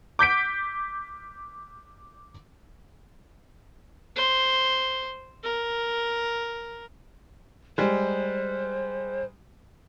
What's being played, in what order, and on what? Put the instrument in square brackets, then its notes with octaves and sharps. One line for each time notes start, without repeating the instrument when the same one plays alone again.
[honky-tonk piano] D6 G6 B6 D7
[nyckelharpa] C5
A#4
[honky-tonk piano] G3 G#3 [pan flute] C5